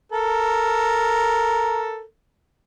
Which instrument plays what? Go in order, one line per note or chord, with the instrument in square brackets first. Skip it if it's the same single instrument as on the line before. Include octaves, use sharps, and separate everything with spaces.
[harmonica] A4 A#4